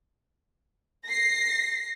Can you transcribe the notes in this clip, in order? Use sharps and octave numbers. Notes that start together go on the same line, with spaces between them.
A#6 C7